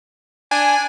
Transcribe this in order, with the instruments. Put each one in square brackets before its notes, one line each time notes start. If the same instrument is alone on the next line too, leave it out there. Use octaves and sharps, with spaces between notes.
[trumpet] D4 [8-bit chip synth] G#5